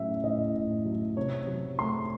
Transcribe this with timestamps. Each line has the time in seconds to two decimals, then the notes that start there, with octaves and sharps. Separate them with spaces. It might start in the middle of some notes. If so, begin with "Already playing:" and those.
Already playing: A2 F#3 C#4 E5
0.23 A2 D#5
0.55 A2
0.85 F#3
1.16 C3 C#5
1.47 F#3
1.78 A3 C6